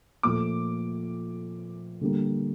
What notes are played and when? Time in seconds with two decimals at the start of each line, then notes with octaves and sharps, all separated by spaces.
0.23 A#2 F3 A3 D6
2.01 D3 G3 A#3